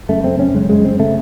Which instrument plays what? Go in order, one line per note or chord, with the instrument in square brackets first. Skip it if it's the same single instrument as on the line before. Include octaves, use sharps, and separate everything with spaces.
[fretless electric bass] F#2 C#3 A3
C4
C#4
F#2 C#3 G#3
G#3
C4
C#3 A3